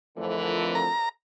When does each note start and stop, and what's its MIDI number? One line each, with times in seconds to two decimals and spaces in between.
0.18 0.89 41
0.18 0.89 50
0.18 0.83 52
0.18 0.88 53
0.18 0.88 57
0.18 0.88 70
0.75 1.09 82